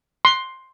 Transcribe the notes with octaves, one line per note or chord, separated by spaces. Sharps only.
C6